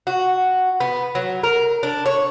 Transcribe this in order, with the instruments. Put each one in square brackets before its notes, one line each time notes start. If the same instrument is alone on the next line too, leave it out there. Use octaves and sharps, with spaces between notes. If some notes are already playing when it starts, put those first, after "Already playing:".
[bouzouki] F#4
B3
F#3
A#4
D4
C#5